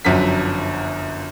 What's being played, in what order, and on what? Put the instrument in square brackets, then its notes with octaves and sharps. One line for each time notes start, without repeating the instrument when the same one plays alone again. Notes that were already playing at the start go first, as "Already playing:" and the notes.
[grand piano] G1 F#2 F3 F#3 B6